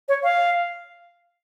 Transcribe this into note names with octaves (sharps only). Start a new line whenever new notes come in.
C#5
F5